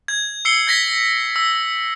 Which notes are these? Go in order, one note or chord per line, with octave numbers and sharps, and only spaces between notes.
G#6
E6 C7 C#7 G7
G#6 A#6 B6
E6